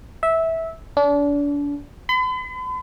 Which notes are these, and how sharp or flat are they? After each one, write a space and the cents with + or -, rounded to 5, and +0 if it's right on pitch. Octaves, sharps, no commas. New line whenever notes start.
E5 -15
D4 -35
B5 +45